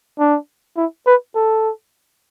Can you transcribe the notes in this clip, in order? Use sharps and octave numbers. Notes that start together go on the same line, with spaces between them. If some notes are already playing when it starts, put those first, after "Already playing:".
D4
E4
B4
A4